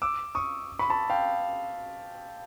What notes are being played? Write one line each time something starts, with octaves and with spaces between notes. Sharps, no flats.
D6 E6
C#6 D#6
B5 C#6
A5 B5
F5 G5